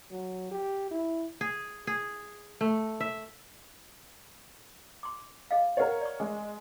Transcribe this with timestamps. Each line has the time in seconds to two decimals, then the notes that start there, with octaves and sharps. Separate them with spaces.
0.11 F#3
0.51 G4
0.91 E4
1.41 G#4
1.87 G#4
2.61 A3
3.00 E5
5.03 C6 D6
5.51 G#4 D#5 F5
5.77 A#4 C#5 D#5 F#5 A#5
6.01 D5 C#6
6.20 G#3 G#4